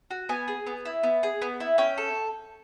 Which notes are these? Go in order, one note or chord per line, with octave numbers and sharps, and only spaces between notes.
F#4
B3 G#5
G#4
B3
E4
B3
G#4
B3
E4
C#4 G5
A4